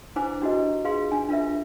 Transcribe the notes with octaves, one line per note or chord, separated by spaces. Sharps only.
D4 E4 B4 C5 G#5 D6
D4 E4 F#4 G4 B4 D#5
F4 G#4 B4 F5 C6
D4 G#5
D4 F4 A#4 B4 E5